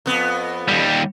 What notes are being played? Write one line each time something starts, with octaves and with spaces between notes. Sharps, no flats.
F2 B3
D#2 G3